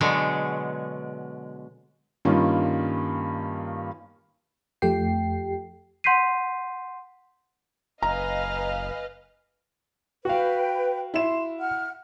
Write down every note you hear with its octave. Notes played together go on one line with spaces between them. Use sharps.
B2 D3 F#3 G#3
G2 D#3 G3 A#3 C#4 F4
F2 F3 A3 G4 G5 C7
F#5 C6 G6 B6 C7 D#7
F#1 B4 D#5 F5 G#5 A#5 F6
F#4 B4 F5 G5
E4 C6 E7
F#5 F6